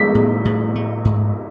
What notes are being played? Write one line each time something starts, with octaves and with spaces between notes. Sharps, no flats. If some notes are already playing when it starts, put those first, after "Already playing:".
Already playing: G#3 B6
A2
A2
A3
G#2